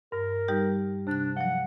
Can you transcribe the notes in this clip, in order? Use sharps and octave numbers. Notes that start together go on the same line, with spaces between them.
G2 A#4
G3 D#4 G4
C3 D4 F#6
F3 F#3 F#5